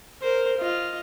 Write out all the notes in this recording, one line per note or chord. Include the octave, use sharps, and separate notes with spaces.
A#4 C5
F4 D#5